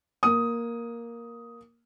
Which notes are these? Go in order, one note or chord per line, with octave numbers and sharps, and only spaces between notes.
A#3 D#6